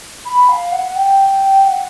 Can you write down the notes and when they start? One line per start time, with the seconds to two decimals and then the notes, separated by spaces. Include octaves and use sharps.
0.25 B5
0.48 F5
0.72 F#5
0.96 G5
1.66 F#5